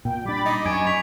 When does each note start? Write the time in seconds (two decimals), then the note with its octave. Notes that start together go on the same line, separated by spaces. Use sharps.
0.05 A#2 G5
0.25 G3 D4 B5 D6 A6
0.46 D#4
0.65 F#2 G#5 C#6 D6 G#6 D7
0.87 D6 B6 F7